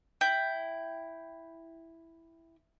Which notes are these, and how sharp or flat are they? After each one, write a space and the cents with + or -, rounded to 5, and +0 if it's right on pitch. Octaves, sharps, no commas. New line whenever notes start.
E4 +0 G5 +0